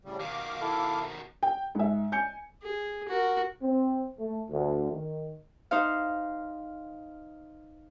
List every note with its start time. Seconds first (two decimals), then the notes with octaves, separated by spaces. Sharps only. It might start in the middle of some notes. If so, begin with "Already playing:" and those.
0.05 A2 C#3 G3
0.20 B2 D#3 F5 D6
0.61 E4 A4
1.43 G5
1.75 G#2 E5
2.12 G#5 G6 C#7
2.63 G#4
3.08 F#4 A#4
3.62 C4
4.18 A3
4.49 D2
4.92 D#3
5.71 D#4 C5 F5